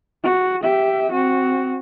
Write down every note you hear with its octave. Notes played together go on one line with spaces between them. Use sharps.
F#4
G4 E5
C4 F#4